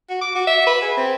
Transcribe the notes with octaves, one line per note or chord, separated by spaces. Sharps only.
F#4
D6
F#4
E5
B4
G#4
C4